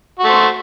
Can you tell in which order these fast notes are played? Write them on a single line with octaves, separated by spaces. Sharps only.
F#4 A3 C5